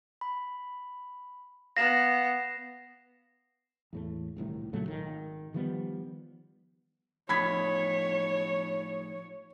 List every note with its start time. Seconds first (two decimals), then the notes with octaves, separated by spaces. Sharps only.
0.21 B5
1.77 B3 F5 A#6 C7 E7
3.93 E2 A2 A3
4.36 D#1 C2 A2 D#3
4.73 A#2 C#3 F#3 A3
4.88 G#1 D#3
5.54 D#3 F3 G3 B3
7.29 A2 F3 D#4 C#5 B5 G#6 B6